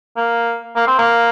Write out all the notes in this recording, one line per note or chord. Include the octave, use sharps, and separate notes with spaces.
A#3
A#3
C4
A#3